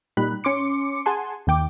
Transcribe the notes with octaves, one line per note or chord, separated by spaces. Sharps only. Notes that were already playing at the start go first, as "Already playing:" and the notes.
A#2 G3 D#4 B5 F#6
C#4 C6 D6 C#7
G#4 F#5 G#5 A5 C6
D#2 D#3 G5 D6